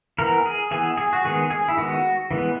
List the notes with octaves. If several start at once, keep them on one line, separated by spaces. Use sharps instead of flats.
E3 B3 A#4
G#4
E3 B3 G#4
G#4
F#4
D#3 G#3 B3 G#4
G#4
E4
D#3 G#3 B3 F#4
E3 G#3 B3